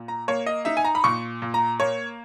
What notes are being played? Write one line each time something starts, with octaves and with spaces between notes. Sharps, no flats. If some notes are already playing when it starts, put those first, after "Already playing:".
Already playing: A#2
A#5
A#3 C#5
D#5
D#4 E5
G#5
A#5
B5
A#2 C#6
A#2
A#5
A#3 C#5